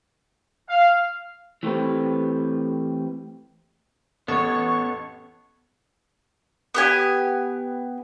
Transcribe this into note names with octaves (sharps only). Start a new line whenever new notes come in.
F5
E3 A3 C4 G4 B4
A1 B3 A4 C#5 F#5 A5 C#6
B3 G4 G#5